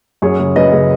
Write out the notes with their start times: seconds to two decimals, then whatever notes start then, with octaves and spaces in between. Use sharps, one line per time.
0.22 F#2 G#4 C#5
0.39 C#3
0.56 F#2 B4 D#5
0.72 C#3